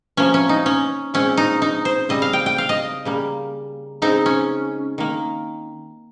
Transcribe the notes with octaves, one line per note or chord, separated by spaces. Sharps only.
C3 F3 A#3 C#4
C#4
D#4
C#4
A#2 G#3 C4 C#4
D#4
D#4
C5
C#3 G3 C4 D#5
F5
G5
G5
F5
D#5
C#3 G3 A#3
C#3 G#3 C4 D#4
C#4
D#3 A#3